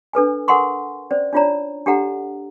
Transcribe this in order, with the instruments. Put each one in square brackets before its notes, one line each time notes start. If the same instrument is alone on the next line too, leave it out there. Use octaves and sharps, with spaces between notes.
[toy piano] D4 A4 B4 G#5
A4 A#4 F#5 G#5 C6 C#6
C#4 C5 D5
D4 D#4 F4 C#5 D5 A#5
D4 G4 A4 F#5 A#5